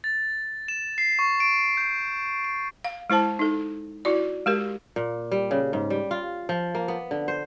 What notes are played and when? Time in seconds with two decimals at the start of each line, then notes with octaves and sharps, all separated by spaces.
0.04 A6
0.68 E7
0.98 C7
1.19 C#6
1.40 D7
1.77 G6
2.45 D7
2.84 F5
3.10 G#3 E4 C5 A5
3.39 D#4 A4
4.05 E4 F#4 D5
4.46 G#3 G4 A#4
4.96 A#2
5.32 G3
5.51 C#3
5.73 G#2
5.90 G3
6.11 F4
6.49 F3
6.75 A#3
6.88 B3
7.11 D3
7.28 C5